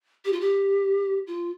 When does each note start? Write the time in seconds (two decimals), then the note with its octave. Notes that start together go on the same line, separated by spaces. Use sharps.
0.25 G4
0.33 F4
0.40 G4
1.27 F4